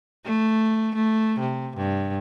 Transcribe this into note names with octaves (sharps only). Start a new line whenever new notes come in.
A3
A3
C3
G2